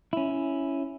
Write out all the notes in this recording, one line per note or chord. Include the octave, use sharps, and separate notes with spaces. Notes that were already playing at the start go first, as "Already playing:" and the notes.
C#4 E4